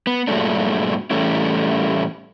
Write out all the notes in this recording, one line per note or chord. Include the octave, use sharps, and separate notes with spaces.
B3
G2 A#2 F#3 G#3 A3 D4
A2 E3 G3 A3 C#4 E4